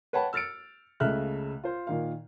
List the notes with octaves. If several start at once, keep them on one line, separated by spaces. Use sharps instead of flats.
B4 C#5 F#5 G5 A5 B5
E6 F6 A6 C#7 D7
C#2 C#3 A3 E5 F6 F#6
F4 C5
A#2 D#3 F5